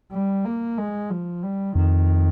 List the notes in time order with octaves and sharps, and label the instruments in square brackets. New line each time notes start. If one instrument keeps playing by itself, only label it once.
[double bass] G3
A#3
G#3
F3
G3
[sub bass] F2 [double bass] D#3